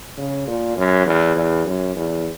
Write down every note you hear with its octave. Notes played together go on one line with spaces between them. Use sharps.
C#3
A#2
F#2
E2
E2
F#2
E2